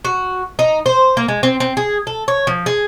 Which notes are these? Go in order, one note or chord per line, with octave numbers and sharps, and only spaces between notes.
F#4
D#4
C5
A#3
G#3
C4
C4
G#4
A4
C#5
F3
G#4